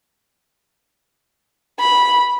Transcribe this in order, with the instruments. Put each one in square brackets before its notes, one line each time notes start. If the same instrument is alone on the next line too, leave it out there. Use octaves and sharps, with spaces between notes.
[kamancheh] B5